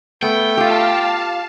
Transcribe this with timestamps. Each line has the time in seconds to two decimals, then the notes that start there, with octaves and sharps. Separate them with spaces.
0.22 A3 B3 G5
0.57 F4 G4 F5 A5